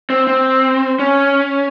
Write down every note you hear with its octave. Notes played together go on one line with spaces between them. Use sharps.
C4
C4
C#4